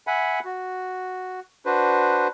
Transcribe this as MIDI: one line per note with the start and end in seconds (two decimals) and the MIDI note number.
0.07 0.40 76
0.07 0.40 78
0.07 0.40 80
0.07 0.40 83
0.45 1.40 66
1.66 2.28 62
1.66 2.28 66
1.66 2.28 71
1.66 2.28 72